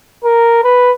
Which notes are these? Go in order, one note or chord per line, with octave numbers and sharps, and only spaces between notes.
A#4
B4